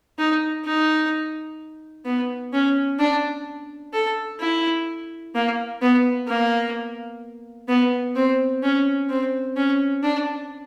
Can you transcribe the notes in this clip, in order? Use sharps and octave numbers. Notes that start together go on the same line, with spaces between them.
D#4
D#4
B3
C#4
D4
A4
E4
A#3
B3
A#3
B3
C4
C#4
C4
C#4
D4